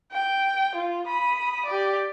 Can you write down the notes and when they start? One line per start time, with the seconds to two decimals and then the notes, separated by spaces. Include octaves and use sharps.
0.12 G5
0.75 F4
1.05 B5 D#6
1.65 G4 D5